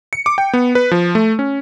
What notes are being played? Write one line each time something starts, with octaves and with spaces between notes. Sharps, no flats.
C#7
D6
G5
B3
B4
F3
A3
C#4